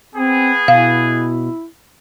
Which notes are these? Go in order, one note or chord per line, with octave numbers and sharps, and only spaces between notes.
B3 C4 G#4
B2 E4 F5